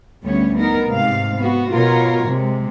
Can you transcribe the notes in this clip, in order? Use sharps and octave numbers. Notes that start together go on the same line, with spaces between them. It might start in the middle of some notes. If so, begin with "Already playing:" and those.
D2 G3 A3 B3 C#4 C#5
B3 D#4 A#4
G#2 C3 F5
B3 F#4
B2 F4 A#4 C#5
C3 G#3